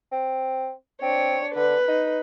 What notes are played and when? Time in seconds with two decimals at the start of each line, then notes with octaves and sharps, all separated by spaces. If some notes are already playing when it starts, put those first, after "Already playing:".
0.12 C4
1.02 C4 D4 C#5
1.56 D3 B4
1.88 D#4